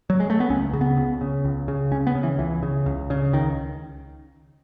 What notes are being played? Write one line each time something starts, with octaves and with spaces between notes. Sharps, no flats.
F#3
G#3
A3
B3
C#2 C#4
C#3
B3
C#2
C#3
C#2
C#3
C#2 C#4
B3
C#3
E3
C#2 E3
C#3
C#2
C#3
C#2 D#3